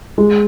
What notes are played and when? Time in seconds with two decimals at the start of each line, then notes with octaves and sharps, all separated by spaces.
0.18 G#3